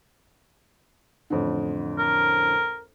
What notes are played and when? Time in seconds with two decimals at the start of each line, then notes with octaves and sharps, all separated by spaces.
1.30 A1 F2 D3
1.98 A#4